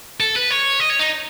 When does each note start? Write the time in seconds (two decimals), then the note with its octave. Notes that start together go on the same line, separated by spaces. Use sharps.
0.20 A4
0.36 B4
0.50 C#5
0.80 D#5
0.89 C#5
1.00 D#4